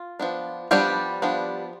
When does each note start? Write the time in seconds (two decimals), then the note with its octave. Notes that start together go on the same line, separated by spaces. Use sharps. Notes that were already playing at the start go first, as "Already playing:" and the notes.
Already playing: F4
0.20 F3 B3 D4
0.71 F3 G3 B3 D4 G4
1.22 F3 B3 D4